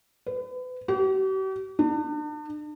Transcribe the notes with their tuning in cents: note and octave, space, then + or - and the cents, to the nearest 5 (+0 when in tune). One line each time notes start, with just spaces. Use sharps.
B4 +35
G4 -45
D4 +40